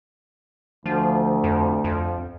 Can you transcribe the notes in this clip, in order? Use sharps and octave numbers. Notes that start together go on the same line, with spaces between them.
D2 F3
F2
F2